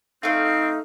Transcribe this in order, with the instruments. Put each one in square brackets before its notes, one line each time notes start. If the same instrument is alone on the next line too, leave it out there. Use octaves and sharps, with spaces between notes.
[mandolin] A3 F5 [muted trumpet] C4 [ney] D#4